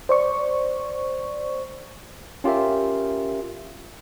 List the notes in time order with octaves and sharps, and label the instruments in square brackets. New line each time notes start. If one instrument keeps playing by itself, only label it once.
[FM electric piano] C5 D5 C#6
[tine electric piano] C#4 F4 G4 A#4 E5